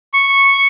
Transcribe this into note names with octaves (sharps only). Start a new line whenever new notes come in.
C#6